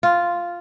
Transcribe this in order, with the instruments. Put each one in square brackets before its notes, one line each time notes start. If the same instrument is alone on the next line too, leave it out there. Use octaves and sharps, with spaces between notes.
[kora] F4